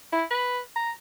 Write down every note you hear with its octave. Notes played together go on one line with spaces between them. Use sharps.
E4
B4
A#5